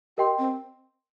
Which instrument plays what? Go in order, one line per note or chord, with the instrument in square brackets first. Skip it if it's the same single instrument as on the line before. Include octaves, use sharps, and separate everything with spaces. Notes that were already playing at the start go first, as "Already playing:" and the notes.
[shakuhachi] G4 [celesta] A#4 D#5 G5 C6
[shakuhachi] C4